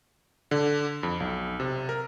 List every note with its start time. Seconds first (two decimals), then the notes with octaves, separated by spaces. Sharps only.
0.51 D3
1.03 F2
1.20 B1
1.60 C3
1.89 A#4